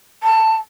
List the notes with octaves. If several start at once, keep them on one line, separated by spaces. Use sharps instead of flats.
A5